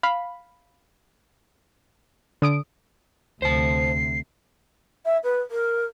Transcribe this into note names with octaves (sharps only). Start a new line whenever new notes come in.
F5 B5
D3 D#6 D7
D2 C3 C5 A5 C7
E5
B4
A#4